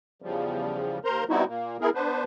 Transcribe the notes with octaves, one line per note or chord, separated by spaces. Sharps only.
E2 C#3 F3 G3
D#2 A#4 C5 A#5 C6
G3 B3 C4 D#4 E4 F#4
A#2 A#3
B3 E4 G#4 A#4
B3 D4 B4 C5